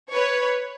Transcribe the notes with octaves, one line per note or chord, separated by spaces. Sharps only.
B4 C#5